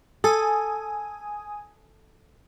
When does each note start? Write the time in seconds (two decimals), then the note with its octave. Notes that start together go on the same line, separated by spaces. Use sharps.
0.24 A4 G#5 D#6